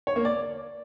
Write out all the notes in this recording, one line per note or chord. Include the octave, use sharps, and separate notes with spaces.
C#5
A#3
D5